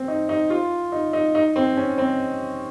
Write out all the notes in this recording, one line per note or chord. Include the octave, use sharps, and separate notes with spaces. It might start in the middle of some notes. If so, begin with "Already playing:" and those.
Already playing: C4
D#4
D#4
F4
D#4
D#4
D#4
C4
C#4
C4